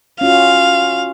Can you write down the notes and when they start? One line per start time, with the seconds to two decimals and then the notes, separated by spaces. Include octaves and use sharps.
0.21 C#4 F4 F#4 F5